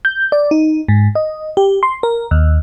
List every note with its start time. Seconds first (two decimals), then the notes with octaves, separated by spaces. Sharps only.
0.05 G6
0.32 D5
0.51 D#4
0.88 G#2
1.15 D#5
1.57 G4
1.83 C6
2.03 A#4
2.31 D#2